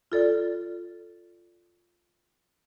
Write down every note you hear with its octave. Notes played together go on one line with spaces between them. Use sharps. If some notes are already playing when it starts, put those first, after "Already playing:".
F4 A4 D5